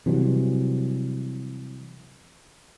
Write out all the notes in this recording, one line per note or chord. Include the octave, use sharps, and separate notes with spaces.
C3 E3 F#3 G3